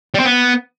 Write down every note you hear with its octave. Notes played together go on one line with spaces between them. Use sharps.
G3
C4
B3